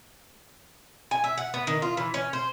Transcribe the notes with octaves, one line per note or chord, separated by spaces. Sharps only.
G#5
E5
F#5
B3
D#3
F4
E3
C#4
C5